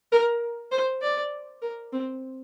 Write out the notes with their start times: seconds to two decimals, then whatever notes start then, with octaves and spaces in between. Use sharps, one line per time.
0.12 A#4
0.71 C5
1.01 D5
1.62 A#4
1.93 C4